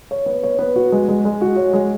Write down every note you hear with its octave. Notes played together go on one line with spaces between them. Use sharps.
C#5
B3
C#5
B3
F#4
G#3
G#3
G#3
F#4
C#5
G#3